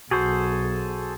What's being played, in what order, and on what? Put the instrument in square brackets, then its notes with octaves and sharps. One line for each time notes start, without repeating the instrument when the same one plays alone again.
[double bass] B1 [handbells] F#4 [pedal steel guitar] G#4 A4 C5